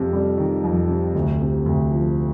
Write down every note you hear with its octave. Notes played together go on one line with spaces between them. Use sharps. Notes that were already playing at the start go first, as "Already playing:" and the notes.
Already playing: F2 C3
G3
D#3
F2
C3
D2
C3
D2
F3